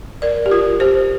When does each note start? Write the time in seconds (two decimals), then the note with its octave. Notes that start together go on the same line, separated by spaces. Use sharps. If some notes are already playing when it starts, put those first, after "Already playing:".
0.22 A#4 D5
0.46 G4
0.51 F4 A#4
0.80 G4 C5